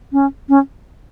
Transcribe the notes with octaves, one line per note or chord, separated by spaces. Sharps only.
C#4
C#4